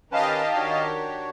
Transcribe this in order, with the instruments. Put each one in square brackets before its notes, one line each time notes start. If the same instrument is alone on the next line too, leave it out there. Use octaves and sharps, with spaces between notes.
[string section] D#3 G4 A#4 [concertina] C#4 B4 [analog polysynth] D#5 F5 A5
[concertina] D4 F#4 C#5